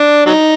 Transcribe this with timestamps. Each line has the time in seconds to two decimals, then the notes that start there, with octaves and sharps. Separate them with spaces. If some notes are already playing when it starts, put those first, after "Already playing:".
Already playing: D4
0.26 F#3 D#4